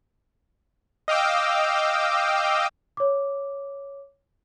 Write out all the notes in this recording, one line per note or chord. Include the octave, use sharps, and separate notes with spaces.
D#5 F5 G5 D6 E6
C#5 D6